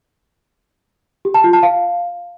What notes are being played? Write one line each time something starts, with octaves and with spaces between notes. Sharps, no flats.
G4
A5
F4
A5
F5